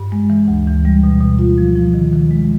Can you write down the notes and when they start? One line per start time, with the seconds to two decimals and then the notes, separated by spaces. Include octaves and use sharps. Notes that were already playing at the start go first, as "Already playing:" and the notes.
Already playing: G2
0.12 G#3
0.30 E3
0.48 D2
0.67 E3
0.85 G3
1.04 B2
1.21 B2
1.39 F4
1.58 F3
1.75 F3
1.94 D#3
2.13 D#3
2.31 G#3